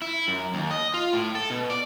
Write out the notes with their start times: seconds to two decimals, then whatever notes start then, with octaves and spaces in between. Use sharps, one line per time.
0.02 E4
0.28 F#2
0.54 D#2
0.71 D#5
0.94 F4
1.13 A2
1.35 A4
1.50 B2
1.70 D5